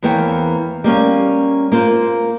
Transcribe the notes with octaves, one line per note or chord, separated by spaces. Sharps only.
E2 E3 A#3 C5 C#5 G5
G3 A#3 C#4
A#3 F4 C5